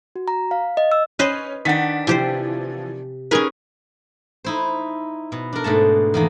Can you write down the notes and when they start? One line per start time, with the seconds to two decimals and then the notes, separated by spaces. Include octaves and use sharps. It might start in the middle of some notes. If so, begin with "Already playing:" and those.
0.16 F#4
0.28 A#5
0.51 F5
0.77 D#5
0.92 E6
1.19 C#4 B4 C5 D#5
1.65 D#3 D4 F#5 A6 B6
2.07 C3 E3 F3 G4 C5
3.31 C#4 D#4 G#4 A#4 B4
4.44 D#4 E4 C5
5.32 B2
5.53 D4 A#4
5.64 G#2 B2 A3 A5
6.14 E2 D#3 A#3